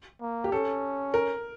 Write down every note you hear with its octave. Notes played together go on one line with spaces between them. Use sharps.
A#3
G4
C#4 A4
A#4